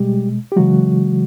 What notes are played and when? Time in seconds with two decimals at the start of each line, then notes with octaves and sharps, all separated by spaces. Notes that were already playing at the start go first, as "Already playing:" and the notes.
Already playing: B2 G3 G#3 G4
0.52 G4
0.56 C#3 E3 F#3 G#3 F#4